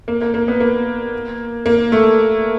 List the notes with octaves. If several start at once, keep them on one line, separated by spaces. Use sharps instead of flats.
A#3
A#3
A#3
B3
A#3
A#3
A3